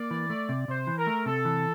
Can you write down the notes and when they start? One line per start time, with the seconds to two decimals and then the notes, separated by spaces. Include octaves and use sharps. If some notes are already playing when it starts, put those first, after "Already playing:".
Already playing: A#3 D5
0.11 E3
0.30 A3
0.49 C3
0.68 C3 C5
0.87 E3
0.97 A#4
1.07 A3
1.26 C3 A4
1.45 E3